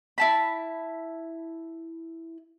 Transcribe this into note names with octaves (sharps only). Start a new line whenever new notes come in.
E4 A5 B5